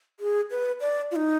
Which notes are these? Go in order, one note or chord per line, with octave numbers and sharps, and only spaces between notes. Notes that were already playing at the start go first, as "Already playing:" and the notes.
G#4
B4
D5
F4
D#4